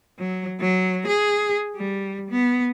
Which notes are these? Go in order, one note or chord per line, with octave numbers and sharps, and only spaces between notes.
F#3
F#3
G#4
G3
B3